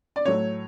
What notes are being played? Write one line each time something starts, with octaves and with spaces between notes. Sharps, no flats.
D5
A2 F#3 A3 C#5